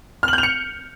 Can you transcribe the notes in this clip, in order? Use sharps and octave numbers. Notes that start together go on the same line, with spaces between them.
F6
F#7
G6
F7
C#7